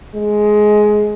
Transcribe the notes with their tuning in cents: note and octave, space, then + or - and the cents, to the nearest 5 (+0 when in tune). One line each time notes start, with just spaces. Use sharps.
G#3 +15